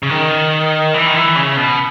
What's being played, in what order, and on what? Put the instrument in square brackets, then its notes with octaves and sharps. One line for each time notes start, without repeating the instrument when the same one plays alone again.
[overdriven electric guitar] C#3
D#3
E3
D#3
E3
C#3
B2